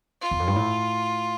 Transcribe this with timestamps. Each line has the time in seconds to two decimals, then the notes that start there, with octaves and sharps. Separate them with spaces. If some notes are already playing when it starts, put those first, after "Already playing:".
0.21 F4
0.31 E2
0.39 F2
0.47 G2
0.56 A2